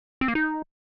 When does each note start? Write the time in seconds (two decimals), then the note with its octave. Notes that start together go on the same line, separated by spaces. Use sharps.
0.21 C4
0.28 A#3
0.35 D#4